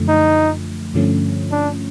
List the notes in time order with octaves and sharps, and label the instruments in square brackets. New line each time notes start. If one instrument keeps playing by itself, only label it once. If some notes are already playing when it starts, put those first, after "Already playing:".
Already playing: [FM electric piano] F#2 D3 F3 A3
[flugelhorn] D#4
[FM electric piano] G2 D3 F3 A3 C#4
[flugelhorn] D4